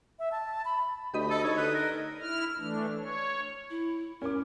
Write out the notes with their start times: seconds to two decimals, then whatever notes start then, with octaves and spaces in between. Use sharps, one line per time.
0.19 E5
0.32 A5
0.65 B5
1.14 D2 G4 D#5 B5
1.30 A4
1.44 D#4 A4 C#5 D#5
1.58 D3 B4
1.75 A#4
2.20 E4 F6
2.58 E3 A3 D4
2.98 C#5
3.70 E4
4.22 C#4 A#4 D6